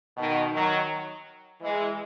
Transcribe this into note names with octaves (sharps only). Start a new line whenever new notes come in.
B2 D#3
D#3 F#3
E3 G#3